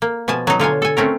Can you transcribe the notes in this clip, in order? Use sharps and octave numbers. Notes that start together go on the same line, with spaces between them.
A#3
B2 F3 G#5 A5
F#3 D#4
D3 F4 C#5 G#5
A4 G#5
A3 C4 C#4 A#4